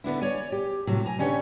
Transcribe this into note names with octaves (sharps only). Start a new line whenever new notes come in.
D3 B3 D4 E4
C#5 D5 G#5
G4
A2 C3 F#3
G#5 A#5
D3 C#4 G4 B4 C#5